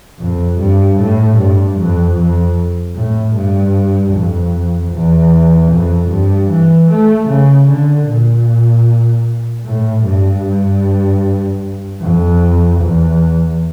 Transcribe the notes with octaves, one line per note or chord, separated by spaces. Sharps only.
F2
G2
A2
G2
F2
F2
A2
G2
F2
E2
F2
G2
E3
A3
C#3
D3
A#2
A2
G2
F2
E2